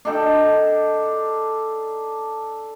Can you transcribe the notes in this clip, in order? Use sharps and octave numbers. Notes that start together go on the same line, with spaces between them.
D4 D#4 A4 G5